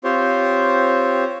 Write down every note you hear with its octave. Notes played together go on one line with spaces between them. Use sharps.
C4 F4 G4 C5 C#5